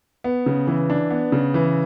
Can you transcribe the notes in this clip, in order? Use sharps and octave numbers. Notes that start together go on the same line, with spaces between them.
B3
C#3
E3
D4
B3
C#3
E3